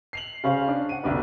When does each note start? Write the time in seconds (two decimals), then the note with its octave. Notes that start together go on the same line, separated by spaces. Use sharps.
0.13 C7 F7 F#7
0.44 C#3 C#4 C5 F5
0.68 D4
0.89 F#5 D#7
1.04 B1 D3 D4 G4 B4